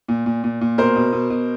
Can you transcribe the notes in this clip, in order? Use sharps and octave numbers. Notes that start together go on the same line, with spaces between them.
A#2
A#2
A#2
A#2
B2 A#4 C5
B2
B2
B2